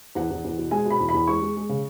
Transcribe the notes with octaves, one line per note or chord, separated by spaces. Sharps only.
E2 F#5
E2
E2
B2
G#3 G#5
B2
B5
E2
B5
E2
G#3 C#6
G#3
G#3
C#3